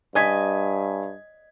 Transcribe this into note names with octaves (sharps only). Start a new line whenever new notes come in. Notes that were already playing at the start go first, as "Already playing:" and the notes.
G2 D#5 G#5 G#6 B6